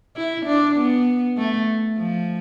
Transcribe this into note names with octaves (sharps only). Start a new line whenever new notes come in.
E4
D4
B3
A3
F3